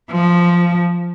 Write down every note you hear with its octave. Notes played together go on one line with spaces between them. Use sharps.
F3